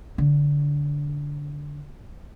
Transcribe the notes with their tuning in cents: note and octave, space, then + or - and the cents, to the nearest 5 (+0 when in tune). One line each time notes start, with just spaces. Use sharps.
D3 -20